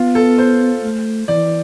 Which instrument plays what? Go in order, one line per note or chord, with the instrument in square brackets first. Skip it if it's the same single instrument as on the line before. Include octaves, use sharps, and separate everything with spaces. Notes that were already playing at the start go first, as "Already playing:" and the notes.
Already playing: [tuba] B3 [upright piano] F4
[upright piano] A4
C5
[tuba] A3
[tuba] E3 [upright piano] D5